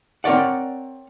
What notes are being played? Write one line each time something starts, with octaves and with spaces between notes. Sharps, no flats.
C4 A#4 C#5 D5 F#5